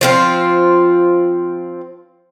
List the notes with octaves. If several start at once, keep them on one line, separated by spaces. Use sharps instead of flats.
F3 C4 F4